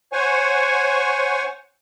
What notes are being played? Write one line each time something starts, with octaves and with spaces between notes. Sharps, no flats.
C5 C#5 F#5 G#5 C#6